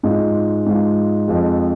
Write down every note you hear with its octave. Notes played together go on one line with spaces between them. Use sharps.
G#2 G#3 F4
G#2 G#3 F4
F2 F3 G#3